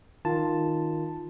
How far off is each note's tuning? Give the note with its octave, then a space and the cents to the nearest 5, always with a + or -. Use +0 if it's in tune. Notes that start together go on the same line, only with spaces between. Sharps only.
D#3 +0 F4 +0 A5 +0